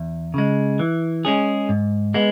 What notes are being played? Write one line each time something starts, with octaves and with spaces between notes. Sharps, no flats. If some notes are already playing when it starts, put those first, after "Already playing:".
Already playing: E2
C#3 G#3
E3
G#3 C#4 G#4
G#2
G#3 B3